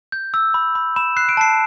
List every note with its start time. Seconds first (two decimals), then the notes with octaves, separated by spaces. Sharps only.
0.12 G6
0.34 E6
0.54 B5
0.75 B5
0.96 B5 E7
1.17 F#6 C7
1.29 D7
1.37 A5 C7